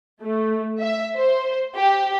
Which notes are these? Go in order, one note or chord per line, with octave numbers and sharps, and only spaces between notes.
A3
E5
C5
G4